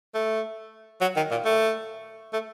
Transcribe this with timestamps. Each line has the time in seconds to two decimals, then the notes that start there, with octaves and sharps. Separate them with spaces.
0.14 A3
1.01 F#3
1.16 D#3
1.31 A#2
1.45 A3
2.33 A3